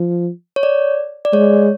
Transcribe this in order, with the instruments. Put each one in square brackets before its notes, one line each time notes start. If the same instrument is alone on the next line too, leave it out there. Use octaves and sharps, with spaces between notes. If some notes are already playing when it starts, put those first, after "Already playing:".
Already playing: [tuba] F3
[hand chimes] C#5
D5
D5
[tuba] G#3 [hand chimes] C#5